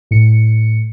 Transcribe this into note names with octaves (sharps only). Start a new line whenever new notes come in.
A2 C#7